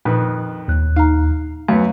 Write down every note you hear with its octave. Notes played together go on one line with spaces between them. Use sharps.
F2 A#2 D#3 B4
D#2 F#6
D#4 F5 A#5
F#2 F#3 A3 B3 F5